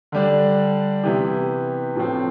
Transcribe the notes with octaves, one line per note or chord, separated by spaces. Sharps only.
D3 G3 D4
C3 E3 B3 E4 G4
A2 F3 C4